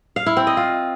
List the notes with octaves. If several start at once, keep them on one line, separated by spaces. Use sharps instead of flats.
F5
E4
C4
D#5
F4